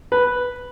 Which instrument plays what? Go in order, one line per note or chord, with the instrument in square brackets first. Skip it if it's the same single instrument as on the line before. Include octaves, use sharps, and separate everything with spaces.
[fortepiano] B4